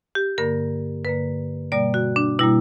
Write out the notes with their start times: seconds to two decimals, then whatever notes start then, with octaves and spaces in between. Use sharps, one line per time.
0.15 G4
0.38 G2 D3 A#3 A#4
1.04 G2 D3 A#3 B4
1.72 B2 G3 A#3 D5
1.94 F#4
2.16 D4
2.39 B2 G3 A#3 E4